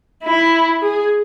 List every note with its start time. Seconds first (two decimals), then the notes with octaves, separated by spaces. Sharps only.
0.24 E4
0.81 G#4